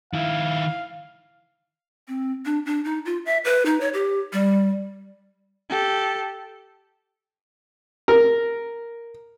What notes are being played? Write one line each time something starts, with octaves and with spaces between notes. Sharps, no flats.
D#3 E4 F5
C4
D4
D4
D#4
F4
E5
B4
D#4
C#5
G4
G3
G4 A4
A#4